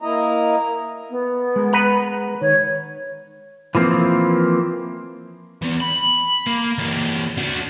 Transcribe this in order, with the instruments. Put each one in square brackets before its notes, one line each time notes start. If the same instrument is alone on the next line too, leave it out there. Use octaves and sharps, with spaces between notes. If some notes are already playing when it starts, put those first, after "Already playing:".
[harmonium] A#3 E4 D#5 A#5
[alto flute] B3
[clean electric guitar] G#3 A#4
[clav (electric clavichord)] B4 F#5 A#5
[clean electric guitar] D#3 [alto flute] C#5
[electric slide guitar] E3 F3 A#3 C4
[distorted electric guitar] E3 B3
B5
A#3
E3 A#3
D4 F#4